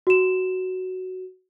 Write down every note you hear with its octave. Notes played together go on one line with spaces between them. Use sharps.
F#4 E7